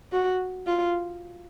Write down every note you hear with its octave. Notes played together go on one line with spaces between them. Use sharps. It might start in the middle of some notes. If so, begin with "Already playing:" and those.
F#4
F4